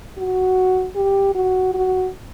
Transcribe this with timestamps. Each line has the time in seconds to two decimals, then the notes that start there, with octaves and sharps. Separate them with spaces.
0.18 F#4
0.96 G4
1.35 F#4
1.74 F#4